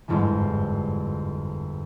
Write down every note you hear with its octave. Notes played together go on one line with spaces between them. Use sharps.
G1 F2 G#2 D3 E3